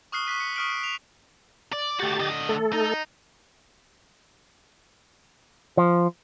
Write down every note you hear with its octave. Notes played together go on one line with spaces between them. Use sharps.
C#6 D#6 F6 F#6 C7 G7
C#6 D6 F#6 B6 D#7
C#7
C#6 D#6 F6 B6 D7 F#7
F#6 B6
F7
D5
A3 F#4 G4 A6
D3 D#5
A3 A4
D#4
F3